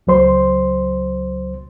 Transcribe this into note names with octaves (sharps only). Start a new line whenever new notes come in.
C#2 F#3 C5 C6